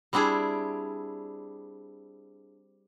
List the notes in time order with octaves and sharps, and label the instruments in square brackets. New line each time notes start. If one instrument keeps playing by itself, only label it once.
[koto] G3 C4 D4 E4 G#4